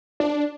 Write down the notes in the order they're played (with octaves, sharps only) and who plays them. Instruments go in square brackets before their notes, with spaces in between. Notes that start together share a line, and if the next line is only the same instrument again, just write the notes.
[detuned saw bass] D4